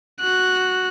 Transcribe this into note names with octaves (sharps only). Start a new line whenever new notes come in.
F#4 F#6